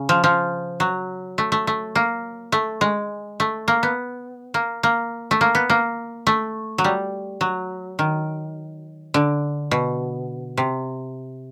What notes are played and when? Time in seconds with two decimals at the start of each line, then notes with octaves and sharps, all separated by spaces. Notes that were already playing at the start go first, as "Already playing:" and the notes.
Already playing: C#3
0.09 F3
0.24 F3
0.80 F#3
1.38 A3
1.52 A3
1.67 A3
1.95 A#3
2.52 A3
2.81 G#3
3.40 A3
3.68 A#3
3.83 B3
4.54 A#3
4.83 A#3
5.31 A3
5.41 A#3
5.55 B3
5.70 A#3
6.27 A3
6.78 F#3
6.84 G3
7.41 F#3
7.99 D#3
9.14 D3
9.71 B2
10.57 C3